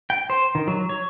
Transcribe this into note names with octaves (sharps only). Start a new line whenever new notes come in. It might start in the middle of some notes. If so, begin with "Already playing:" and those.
G5
C5
D#3
F#3
C#5